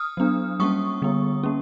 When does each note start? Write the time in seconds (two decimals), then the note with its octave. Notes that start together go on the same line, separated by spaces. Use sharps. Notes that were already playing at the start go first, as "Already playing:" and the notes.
Already playing: D#6 F6
0.17 F#3 B3 D4
0.60 G3 A#3 C#4 C#6 D#6
1.02 D3 G3 B3
1.43 A#3 C#4